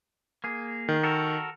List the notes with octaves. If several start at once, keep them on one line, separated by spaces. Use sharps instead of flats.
A#3 G#4
D#3
F#4 A4 A#4